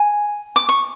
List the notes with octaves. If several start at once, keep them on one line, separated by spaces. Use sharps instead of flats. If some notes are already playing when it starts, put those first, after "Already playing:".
Already playing: G#5
D6
C#6